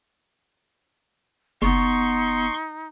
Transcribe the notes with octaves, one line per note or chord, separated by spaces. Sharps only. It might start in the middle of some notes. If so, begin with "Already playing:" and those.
F#1 B3 D#4 C6 C#6